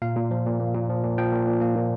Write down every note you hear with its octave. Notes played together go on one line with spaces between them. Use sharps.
A#2 F5
A#2
F3
A#2
A#3
A#2
F3
A#2
F3 G5
A#2
A#2
A#3
A#2